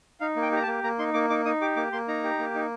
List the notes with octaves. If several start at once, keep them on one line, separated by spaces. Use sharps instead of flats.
D#4 F5
A#3
G5
G4 A#5
A5
A#3
A#3 A#5
D#4 C6
A#3 D6
D#4 D6
D#4 D#6
G4 D6
A#3 D6
A#3 C6
D#4 A#5
G4
A#3
D#4